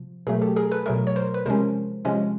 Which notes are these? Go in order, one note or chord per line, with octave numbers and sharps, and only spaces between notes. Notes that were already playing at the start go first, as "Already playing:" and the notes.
Already playing: C3 F3
B2 F#3 A3 G#4 A#4
G4 A4
G#4 A#4
A4 B4
B2 F#3 A3 G#4 A#4
C#5
A#4 C5
B4
C3 F3 G#3 C#4 A#4 C5
C3 F3 G#3 C#4